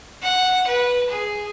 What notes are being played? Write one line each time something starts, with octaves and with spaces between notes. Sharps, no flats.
F#5
B4
G#4